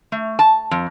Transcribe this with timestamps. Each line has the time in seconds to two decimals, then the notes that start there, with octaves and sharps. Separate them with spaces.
0.12 A3
0.39 A5
0.71 F2